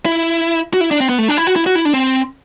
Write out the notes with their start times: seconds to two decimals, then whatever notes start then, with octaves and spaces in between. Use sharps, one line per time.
0.06 E4
0.74 F#4
0.81 E4
0.91 D4
1.00 C4
1.09 B3
1.18 A3
1.28 D4
1.37 E4
1.47 F#4
1.56 E4
1.66 F#4
1.75 E4
1.85 D4
1.94 C4